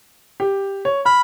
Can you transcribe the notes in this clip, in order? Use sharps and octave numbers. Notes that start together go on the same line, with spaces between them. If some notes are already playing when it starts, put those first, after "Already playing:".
G4
C#5
B5 F6